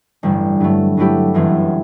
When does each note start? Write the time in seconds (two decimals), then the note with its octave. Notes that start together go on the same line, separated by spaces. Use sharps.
0.23 A1 G2 D3 G3
0.60 G2 F#3 A3
0.97 G2 F#3 A3 E4 G4
1.34 G1 F#2 E3 A3 C4